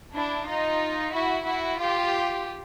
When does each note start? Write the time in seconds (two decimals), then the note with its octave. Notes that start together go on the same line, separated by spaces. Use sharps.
0.13 D4 E4
0.46 D#4 F4
1.12 E4 F#4
1.45 E4 F#4
1.78 F4 G4